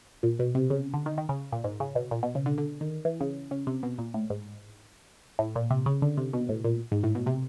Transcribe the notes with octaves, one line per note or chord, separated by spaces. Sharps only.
A#2
B2
C3
C#3
D3
D#3
D#3
C#3
A#2
G#2
C#3
B2
A#2
B2
C#3
D3
D3
D#3
E3
C#3
C#3
C3
B2
A#2
A2
G#2
A2
A#2
C3
C#3
D3
C3
B2
A2
A#2
G#2
A2
B2
C3